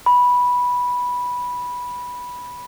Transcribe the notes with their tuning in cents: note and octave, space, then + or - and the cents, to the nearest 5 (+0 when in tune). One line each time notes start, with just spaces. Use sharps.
B5 -10